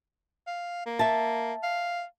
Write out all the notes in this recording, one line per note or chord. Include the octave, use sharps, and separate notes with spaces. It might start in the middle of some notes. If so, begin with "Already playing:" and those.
F5
A#3
E5 A5
F5